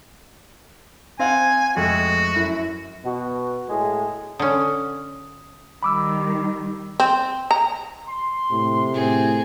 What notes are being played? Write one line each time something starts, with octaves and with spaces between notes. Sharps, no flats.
C4 F5 F#5 G#5
F2 G#3 A3 F#4
F#2 E4
B2 F#4
A2 G#3 G#4
D3 C#4 D#6
D#3 G3 B5 D6 E6
C4
A#5
C6
A2 C3
A2 C4 G#4